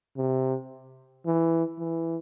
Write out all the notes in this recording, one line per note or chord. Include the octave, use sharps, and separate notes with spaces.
C3
E3
E3